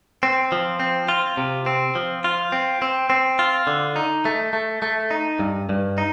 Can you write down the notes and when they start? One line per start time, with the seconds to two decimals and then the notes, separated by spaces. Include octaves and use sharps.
0.23 C4
0.52 F3
0.80 C4
1.08 F4
1.37 C3
1.66 C4
1.95 F3
2.24 F4
2.52 C4
2.82 C4
3.10 C4
3.39 F4
3.67 D3
3.96 D#4
4.25 A3
4.53 A3
4.82 A3
5.11 D#4
5.39 G2
5.69 G2
5.98 D#4